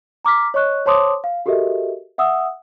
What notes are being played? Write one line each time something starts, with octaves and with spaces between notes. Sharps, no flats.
A#5 D6 F6 B6
C#5 D#5 C#6 F#6
C5 C#5 A5 C6 D6 D#6
F5
F#4 G4 A4 A#4 D#5 E5
E5 F#5 D#6 E6